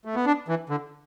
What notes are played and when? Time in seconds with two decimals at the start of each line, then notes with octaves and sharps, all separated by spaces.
0.05 A3
0.15 B3
0.26 D4
0.48 E3
0.69 D3